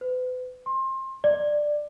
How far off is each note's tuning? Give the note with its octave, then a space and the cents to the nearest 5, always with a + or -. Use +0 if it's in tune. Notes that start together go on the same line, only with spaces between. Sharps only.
B4 +40
C6 +25
D5 +10